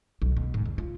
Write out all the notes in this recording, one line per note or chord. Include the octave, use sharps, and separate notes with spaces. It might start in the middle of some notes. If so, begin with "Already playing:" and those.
B1
B2
G#2
E2
F4